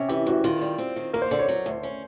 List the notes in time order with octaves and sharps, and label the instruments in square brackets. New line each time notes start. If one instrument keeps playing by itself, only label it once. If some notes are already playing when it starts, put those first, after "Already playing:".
Already playing: [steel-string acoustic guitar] C3 [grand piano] C#4
[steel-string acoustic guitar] E3 [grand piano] G4
[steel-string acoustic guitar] D2 [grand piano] F#4
[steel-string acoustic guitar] D#3 [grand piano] F4
[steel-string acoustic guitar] G3
C4
D#3
[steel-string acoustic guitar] A#3 [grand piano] A#4
[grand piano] C5
[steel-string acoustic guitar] D3 [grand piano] D5
[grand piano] C#5
[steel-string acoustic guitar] F#3
D2
C#4